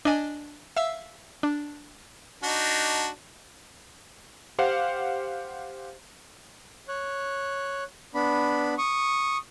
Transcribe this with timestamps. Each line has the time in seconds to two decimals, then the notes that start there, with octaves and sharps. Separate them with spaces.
0.05 D4 D5 D#5 G#5
0.77 E5 F5 E6
1.43 D4
2.43 D4 D#4 F#4
4.59 G4 C5 F5 F#5
6.88 C#5 F#6
8.14 B3 D4 B5
8.78 C#6 D#6